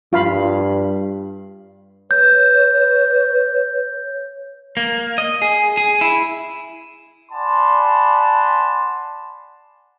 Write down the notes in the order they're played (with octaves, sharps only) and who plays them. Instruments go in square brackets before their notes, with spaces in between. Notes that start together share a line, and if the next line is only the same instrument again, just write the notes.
[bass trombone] G2 [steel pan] F4 F5 B5
[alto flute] B4 [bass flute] C#5 [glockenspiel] G6
[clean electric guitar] A#3
D#5
G#4
G#4
E4
[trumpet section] D5 F#5 G#5 A5 B5 C6